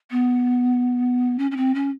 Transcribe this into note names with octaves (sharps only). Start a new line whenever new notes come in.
B3
C#4
C#4
C4
C#4